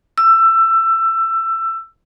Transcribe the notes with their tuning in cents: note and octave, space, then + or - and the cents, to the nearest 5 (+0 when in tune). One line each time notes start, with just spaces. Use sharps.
E6 +20